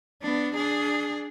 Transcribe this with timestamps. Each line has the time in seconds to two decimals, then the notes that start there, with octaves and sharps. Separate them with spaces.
0.22 B3 D4
0.55 D4 G#4